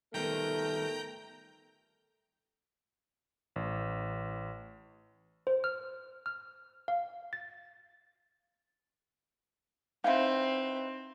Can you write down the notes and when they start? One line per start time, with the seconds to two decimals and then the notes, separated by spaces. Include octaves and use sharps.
0.14 D#3 G3 A3 B3 A#4 G5 A#5 G6
3.56 A1
5.47 C5
5.64 F6
6.26 F6
6.88 F5
7.33 A6
10.04 C4 D#4 E4 B4 F5 F#5